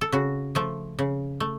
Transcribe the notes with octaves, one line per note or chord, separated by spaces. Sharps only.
A4
C#3 F#4
F3 A3
C#3
A3